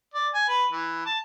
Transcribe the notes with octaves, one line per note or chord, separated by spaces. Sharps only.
D5
G#5
B4
E3
A5